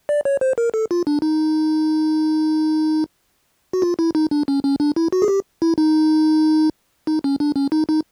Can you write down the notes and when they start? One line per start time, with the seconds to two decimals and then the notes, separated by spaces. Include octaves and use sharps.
0.09 D5
0.25 C#5
0.41 C5
0.58 A#4
0.74 A4
0.91 F4
1.07 D4
1.22 D#4
3.73 F#4
3.82 F4
3.99 E4
4.15 D#4
4.31 D4
4.48 C#4
4.64 C#4
4.80 D4
4.96 E4
5.12 F#4
5.22 G#4
5.28 G4
5.62 E4
5.78 D#4
7.07 D#4
7.24 C#4
7.40 D4
7.56 C#4
7.72 D#4
7.89 D#4